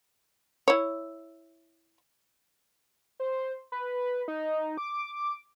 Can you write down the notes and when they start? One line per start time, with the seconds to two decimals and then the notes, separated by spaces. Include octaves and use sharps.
0.68 E4 C#5
3.20 C5
3.72 B4
4.28 D#4
4.78 D6